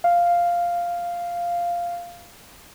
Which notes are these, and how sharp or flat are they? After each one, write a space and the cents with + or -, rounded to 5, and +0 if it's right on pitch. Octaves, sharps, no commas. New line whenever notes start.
F5 -5